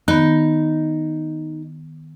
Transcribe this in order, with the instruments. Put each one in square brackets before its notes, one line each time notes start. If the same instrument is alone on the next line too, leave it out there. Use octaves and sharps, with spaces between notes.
[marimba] D#3 B3 [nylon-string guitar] D#4